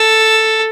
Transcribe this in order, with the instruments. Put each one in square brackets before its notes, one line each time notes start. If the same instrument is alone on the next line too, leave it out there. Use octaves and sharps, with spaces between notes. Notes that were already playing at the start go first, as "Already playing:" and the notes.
Already playing: [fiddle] A4